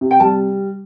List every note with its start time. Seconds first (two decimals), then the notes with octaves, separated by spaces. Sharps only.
0.01 C3
0.11 G5
0.20 G3 A5